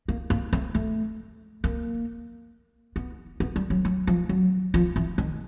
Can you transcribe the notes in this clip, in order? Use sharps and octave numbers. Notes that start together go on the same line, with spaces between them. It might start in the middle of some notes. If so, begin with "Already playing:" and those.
A#3
A#3
A3
A3
A#3
B3
B3
G3
F#3
F#3
F3
F#3
F3
E3
D#3